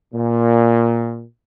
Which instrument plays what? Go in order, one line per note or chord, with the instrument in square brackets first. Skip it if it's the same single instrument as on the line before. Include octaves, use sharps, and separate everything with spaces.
[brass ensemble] A#2